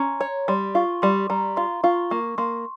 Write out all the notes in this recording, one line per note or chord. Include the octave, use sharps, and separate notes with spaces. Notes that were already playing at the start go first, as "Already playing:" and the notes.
Already playing: C#4 A#5 C6
C#5
G3 C6
F4 C#6
G3 C6
G3 A#5
F4 C6
F4 C#6
A#3 C#6
A#3 C6